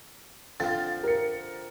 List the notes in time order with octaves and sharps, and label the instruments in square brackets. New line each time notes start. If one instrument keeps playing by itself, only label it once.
[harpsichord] D3 F3 C4 [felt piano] F5 A6
[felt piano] A#4 C#7